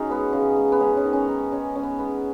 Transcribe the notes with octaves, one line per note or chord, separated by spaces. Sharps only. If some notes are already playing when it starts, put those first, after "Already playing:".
Already playing: C#4 D#4 F#4 G#4
G#3 B3
C#3
G#3
B3
G#3 C#4
C#4
D#3
C#4
D#3 D#4
G#3 C#4
G#3 C#4
B3
G#3 B3